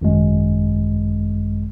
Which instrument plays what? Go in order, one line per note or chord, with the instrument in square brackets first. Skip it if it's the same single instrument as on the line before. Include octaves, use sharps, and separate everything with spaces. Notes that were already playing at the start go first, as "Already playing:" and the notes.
[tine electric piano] G#1 F#2 G#3